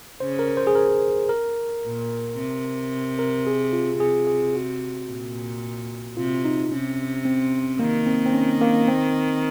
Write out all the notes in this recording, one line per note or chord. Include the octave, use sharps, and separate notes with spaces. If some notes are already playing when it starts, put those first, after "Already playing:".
C#3 C5
A#4
C5
G#4
A#4
A#4
A#2
C3
A#4
G#4
F4
C3 G#4
G#4
F#4
A#2
C3 F4
D#4
C3 C#4
C4
D#3 A#3
C4
C4
C#4
A#3
C4